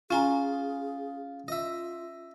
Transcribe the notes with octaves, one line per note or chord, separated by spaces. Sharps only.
C#4 F4 G#4 G#5 A#5 C6
F4 D#5 E5